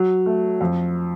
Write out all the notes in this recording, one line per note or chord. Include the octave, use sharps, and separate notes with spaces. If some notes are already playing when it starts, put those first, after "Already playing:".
Already playing: F#3
A3
F2